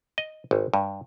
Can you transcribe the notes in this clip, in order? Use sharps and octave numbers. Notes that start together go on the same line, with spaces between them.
D#5
G#1
G2